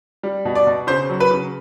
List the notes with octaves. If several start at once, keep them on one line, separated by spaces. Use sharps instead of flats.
G3
B2
D5
B2
C#3 C5
F#3
B4
C#3